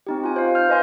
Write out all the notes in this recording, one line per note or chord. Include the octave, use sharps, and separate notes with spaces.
C4 D#4 G4
F4 G#5
C5 F5
F6 G6
B4 D#5 G#5 C6